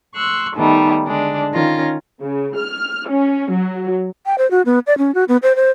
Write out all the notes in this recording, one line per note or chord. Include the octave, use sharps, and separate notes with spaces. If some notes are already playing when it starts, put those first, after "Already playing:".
C6 C#6 E6 F#6
D#3 G3 A3 B3 D#4
D3 G#3 D4
D#3 C#4 F4 A#6
C#3
F6
C#4
F#3
G5
C5
F#4
B3
D5
C#4
F#4
B3
C5
C5